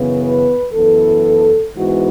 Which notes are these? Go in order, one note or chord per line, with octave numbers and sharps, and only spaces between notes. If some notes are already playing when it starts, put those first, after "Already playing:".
Already playing: F#2 C#3 E3 B3
B4
F#2 E3 B3 A4
G#2 E3 B3 F#4